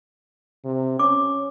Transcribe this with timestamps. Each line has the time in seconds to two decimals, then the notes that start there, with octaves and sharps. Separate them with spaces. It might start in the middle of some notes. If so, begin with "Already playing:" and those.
0.65 C3
0.99 C#4 D6